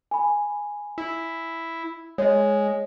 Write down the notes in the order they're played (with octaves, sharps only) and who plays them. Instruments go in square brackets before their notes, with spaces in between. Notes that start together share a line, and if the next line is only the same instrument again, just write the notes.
[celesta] G#5 B5
[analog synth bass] E4
[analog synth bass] G#3 [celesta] C#5 D#5